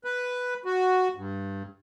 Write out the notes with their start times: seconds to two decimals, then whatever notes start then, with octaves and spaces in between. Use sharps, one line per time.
0.04 B4
0.65 F#4
1.16 G2